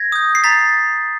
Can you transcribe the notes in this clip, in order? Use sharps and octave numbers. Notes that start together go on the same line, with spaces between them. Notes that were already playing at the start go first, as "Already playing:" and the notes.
Already playing: G#6 A#6
D#6 G6
C7
A#5 A6 B6